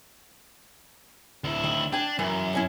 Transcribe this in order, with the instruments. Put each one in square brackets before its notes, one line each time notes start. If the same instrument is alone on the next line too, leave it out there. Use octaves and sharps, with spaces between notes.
[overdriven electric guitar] D2 E4
[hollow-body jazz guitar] D#3
[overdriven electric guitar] D4 [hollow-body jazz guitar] G5 G#5
[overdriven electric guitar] F#2 [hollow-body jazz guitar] E3
[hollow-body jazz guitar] B2 C#4 E4